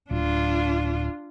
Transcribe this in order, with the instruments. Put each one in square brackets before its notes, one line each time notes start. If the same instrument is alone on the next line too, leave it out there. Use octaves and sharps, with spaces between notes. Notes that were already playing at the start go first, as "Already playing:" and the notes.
[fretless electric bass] D1 [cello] D4 F4